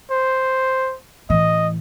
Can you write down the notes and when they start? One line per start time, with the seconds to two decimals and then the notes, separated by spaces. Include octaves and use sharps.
0.10 C5
1.30 A2 E3 D#5